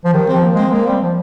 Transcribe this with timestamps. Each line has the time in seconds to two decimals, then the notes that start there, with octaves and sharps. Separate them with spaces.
0.04 F3
0.13 D#3 G3
0.28 C4
0.33 F3
0.43 A#3
0.53 G#3 C4
0.72 G#3 A#3
0.86 G3 C4
1.02 F3